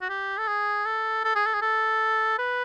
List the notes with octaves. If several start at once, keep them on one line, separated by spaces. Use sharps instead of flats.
F#4
G4
A4
G#4
A4
A4
G#4
A4
G#4
A4
B4